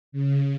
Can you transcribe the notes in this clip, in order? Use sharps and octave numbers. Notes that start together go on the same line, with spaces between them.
C#3